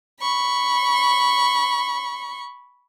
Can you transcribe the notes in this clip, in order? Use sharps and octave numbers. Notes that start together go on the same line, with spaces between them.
B5 C#6